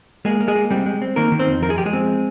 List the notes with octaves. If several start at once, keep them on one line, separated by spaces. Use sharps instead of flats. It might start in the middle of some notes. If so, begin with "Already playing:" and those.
G#3 A#3 G#4
A#3
G#3 G#4
A#3
G3 C4 G4
G#3
C4
D#3 A#3 A#4
D#3
C4 C5
F2
F3 A#4
G#4
F3 G4
G#3 G#4
C4